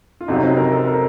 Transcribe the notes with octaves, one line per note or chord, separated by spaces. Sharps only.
F4
F2 C3 F#3 D#4
C4
A#4
A4
A#4